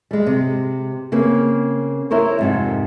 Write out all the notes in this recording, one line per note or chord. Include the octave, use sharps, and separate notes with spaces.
G3 G#3
C3
C#3 A#3 C4
E4 A#4 C5 C#5
F2 G#2 C3